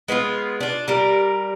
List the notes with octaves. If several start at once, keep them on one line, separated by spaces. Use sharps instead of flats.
G#3 B3 E4 F4
D4 F4
G3 A#4